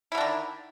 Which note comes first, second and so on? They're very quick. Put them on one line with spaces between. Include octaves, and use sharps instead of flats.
E4 D3 D4 D#3